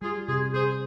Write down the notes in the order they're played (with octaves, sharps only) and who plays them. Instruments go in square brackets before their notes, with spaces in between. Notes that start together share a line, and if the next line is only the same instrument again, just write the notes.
[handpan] G3 [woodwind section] F4 G#4
[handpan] C3 [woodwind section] F4 G#4
[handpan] C3 [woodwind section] G#4 C5